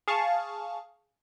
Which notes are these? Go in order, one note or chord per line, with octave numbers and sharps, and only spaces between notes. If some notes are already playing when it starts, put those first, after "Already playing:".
G#4 F5 A5 C#6